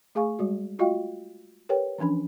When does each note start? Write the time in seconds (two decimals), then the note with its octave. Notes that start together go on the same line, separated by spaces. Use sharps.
0.15 A3 G#4 F5 G#5 C#6
0.39 G3 G#3 F#4
0.79 A3 F4 F#4 D#5 F5 G5
1.69 G4 A#4 B4 C#5 G5
1.98 E3 F3 C#4 D4 B5